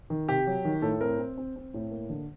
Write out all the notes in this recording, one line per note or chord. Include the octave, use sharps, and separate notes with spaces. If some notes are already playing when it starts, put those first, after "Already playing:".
D#3
C3 G4
F#3
D#3
A2 A4
C4 A#4
C4
C4
C4
A2
A#3
D3